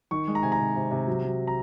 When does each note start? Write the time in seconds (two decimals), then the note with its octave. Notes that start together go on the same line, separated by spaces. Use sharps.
0.11 D#3 C#6
0.28 G#3
0.35 A#5
0.43 C3 G#5
0.52 A#5
0.59 C3
0.76 C3
0.91 C3
1.07 F#3
1.23 F#3
1.47 A#5